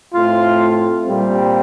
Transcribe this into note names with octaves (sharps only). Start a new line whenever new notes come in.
A2 A3 C4 F4
A#2 G3 C4